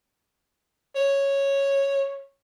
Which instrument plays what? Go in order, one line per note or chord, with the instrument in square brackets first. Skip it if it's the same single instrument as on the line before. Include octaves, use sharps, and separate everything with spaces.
[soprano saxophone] C#5